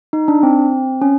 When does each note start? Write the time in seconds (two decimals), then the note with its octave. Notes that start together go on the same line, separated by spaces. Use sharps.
0.13 D#4
0.28 D4
0.43 C4
1.02 C#4